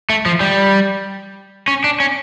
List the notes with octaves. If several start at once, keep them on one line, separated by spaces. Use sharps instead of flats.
A3
F3
G3
C#4
D4
C#4